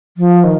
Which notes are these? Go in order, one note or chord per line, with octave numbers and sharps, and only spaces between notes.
F3
D#3